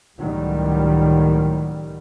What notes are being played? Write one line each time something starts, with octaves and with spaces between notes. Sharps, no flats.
C#2 A2 D#3 F#3 G3